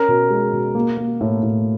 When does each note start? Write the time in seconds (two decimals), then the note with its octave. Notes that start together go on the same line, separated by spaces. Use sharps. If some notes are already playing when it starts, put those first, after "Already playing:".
Already playing: C#4 A#4
0.08 B2
0.30 G#3
0.53 B2
0.75 A#3
0.97 A#3
1.21 A2
1.42 A2